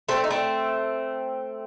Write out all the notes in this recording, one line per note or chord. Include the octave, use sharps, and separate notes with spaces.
A3 C4
D#4
A3 C4